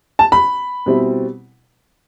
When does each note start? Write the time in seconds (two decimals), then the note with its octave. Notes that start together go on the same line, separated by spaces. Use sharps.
0.19 A5
0.32 B5
0.86 B2 G3 C4 E4